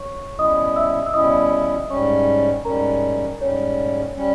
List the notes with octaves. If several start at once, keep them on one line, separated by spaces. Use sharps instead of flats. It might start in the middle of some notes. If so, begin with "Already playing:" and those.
Already playing: C#5 C#6
B2 G3 C#4 E4 D#5 D#6
E5 E6
E6
B2 G3 C#4 E4 D#5 D#6
G#2 G3 C#4 C#5 C#6
G#2 G3 C#4 A#4 A#5
G#2 G3 C#4 C#5
G3 C#4